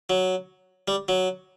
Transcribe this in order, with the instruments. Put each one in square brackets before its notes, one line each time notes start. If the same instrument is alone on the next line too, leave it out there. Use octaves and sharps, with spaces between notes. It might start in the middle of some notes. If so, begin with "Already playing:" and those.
[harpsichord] F#3
G3
F#3